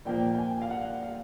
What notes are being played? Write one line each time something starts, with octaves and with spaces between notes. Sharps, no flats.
A#2 F3 A#3 G5
G5
G#5
F5
F#5
F5